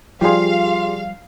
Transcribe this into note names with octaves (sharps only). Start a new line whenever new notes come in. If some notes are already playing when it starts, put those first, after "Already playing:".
F3 G3 F4 G4 G#4 D5 F5 C6